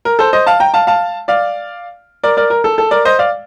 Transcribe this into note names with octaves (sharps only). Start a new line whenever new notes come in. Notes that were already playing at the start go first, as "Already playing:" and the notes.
A#4
A4 C5
C5 D#5
F5 A5
G5 A#5
F5 A5
F5 A5
D5 F5
A#4 D5
A#4 D5
A#4
A4
A4
A#4 D5
C5 D#5
D5 F5